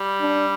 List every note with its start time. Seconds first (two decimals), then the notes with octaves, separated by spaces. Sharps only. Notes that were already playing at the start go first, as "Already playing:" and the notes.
Already playing: G3
0.21 D4